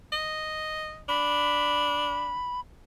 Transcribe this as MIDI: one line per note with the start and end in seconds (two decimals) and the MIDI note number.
0.12 1.00 75
1.09 2.42 62
1.09 2.60 83